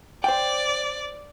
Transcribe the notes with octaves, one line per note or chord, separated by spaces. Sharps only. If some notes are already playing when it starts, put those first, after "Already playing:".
C5 D5 G5